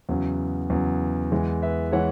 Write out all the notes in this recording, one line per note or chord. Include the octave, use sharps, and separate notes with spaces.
E2 C#3 F#3
E2 C#3 F#3
E2 E3 G#3
B4 E5
E3 G#3 C#5 F#5